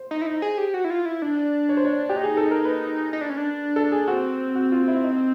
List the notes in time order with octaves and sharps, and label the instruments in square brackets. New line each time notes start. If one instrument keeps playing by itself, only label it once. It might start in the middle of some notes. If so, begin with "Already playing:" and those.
Already playing: [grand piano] C5
[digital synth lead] D#4
E4
D#4
G#4
G4
F#4
E4
F4
E4
[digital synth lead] D4 [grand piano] D5
[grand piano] C#5
C5
C#5
G4
[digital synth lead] D#4
[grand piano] G#4
A4
A#4
B4
[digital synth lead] D#4
D4
C#4
D4
[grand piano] A4
G#4
[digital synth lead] C4 [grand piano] F#4
[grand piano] F#4
F4
E4
D#4